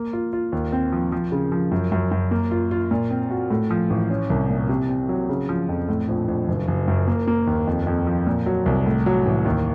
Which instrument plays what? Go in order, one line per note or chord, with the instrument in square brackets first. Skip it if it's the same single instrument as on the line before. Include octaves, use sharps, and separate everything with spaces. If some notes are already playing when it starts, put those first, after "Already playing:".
Already playing: [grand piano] A#3
F4
F4
D#2
C4
F3
F3
C#3
F3
F#2
F#2
F#2
A#3
F4
F4
A#2
C4
F#4
A2
F3
A1
C#4
C2
A#2
C3
C4
F#3
C#3
F3
F2
A2
A#1
A#1
F#1
F#1
F#2
A#3
A#3
D#2
F2
F2
F3
A#2
F#3
C2
A2
F#3
A1
D#2